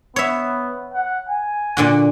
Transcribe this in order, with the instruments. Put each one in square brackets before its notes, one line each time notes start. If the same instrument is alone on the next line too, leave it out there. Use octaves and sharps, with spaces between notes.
[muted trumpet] B3 [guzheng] C#5 E5
[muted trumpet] F#5
G#5
[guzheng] A#2 D3 F#4